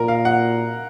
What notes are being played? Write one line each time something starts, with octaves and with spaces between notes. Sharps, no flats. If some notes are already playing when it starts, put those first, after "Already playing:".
Already playing: A#2 A#4
F5
F#5